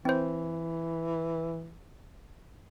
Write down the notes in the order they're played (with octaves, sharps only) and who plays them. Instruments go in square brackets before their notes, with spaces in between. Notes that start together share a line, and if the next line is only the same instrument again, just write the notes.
[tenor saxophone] E3 [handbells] C4 C5